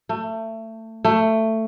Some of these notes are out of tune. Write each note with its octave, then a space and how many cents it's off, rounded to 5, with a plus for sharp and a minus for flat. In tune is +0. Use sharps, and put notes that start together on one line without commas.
A3 +25
A3 +15